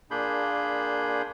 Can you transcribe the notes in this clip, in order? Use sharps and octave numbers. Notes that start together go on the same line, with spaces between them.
A#2 A#3 D4 G#4 B5 G6